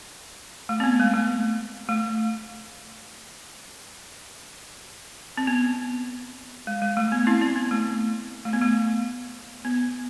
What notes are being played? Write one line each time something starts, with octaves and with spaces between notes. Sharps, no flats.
A3
C4
B3
G#3
A3
A3
C4
B3
G#3
G#3
A3
B3
C4 E4
C4
B3
A3
A3
B3
A3
B3